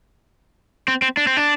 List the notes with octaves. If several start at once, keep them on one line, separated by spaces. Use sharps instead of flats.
C4
C4
D4
C4
D4